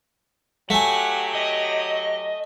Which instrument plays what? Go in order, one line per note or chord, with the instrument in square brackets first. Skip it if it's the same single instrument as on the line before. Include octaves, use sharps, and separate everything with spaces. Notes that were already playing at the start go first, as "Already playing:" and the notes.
[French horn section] F#3 G4 [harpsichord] A3 G#5 [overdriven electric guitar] F#5
[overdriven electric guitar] D#5